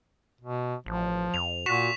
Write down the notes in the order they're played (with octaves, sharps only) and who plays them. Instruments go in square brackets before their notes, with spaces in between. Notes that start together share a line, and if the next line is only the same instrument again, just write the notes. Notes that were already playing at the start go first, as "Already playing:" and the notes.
[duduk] B2
[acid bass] A1 [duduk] F3
[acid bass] F2 [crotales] F7
[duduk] A#2 [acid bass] F#4 [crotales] C#6 B6 E7